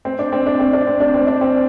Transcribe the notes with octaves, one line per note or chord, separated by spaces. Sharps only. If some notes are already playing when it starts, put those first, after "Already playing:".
C4
D4
C4
D4
C4
D4
C4
D4
C4
D4
C4